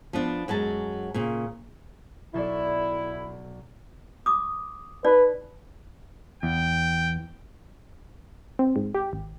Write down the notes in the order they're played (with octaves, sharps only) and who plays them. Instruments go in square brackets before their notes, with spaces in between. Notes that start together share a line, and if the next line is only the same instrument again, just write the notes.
[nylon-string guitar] F3 B3 D4
F#2 F#3 G#3 A5
A#2 C#3
[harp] B1 A4 D5 [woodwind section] E4
[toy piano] D6 D#6
[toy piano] D#4 D5 [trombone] B4
[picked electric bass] E2 [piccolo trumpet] G5
[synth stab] C4
G#2
G4
G#1